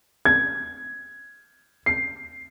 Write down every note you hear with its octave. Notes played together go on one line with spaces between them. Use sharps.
G#6
C7